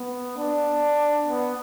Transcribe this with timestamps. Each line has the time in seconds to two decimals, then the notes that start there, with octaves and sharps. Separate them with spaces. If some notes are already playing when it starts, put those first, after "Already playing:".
Already playing: B3
0.37 D4
1.27 B3